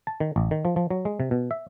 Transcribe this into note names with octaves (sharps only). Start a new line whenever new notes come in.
A5
D#3
A1
D#3
F3
F3
F#3
G#3
C3
B2
E5